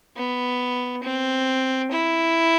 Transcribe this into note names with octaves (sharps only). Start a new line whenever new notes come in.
B3
C4
E4